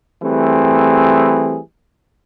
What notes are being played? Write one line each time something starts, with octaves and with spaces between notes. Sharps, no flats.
E3 G3 A3 C4 G#4